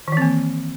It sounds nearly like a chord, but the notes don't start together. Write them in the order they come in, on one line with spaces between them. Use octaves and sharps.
D#3 E3 C4 A#3